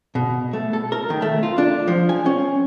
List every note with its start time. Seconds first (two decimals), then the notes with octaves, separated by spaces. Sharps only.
0.15 B2
0.53 A3
0.73 A4
0.92 A#4
1.10 D#3
1.22 A3
1.43 F4
1.58 D4
1.88 F3
2.09 G#5
2.26 C#4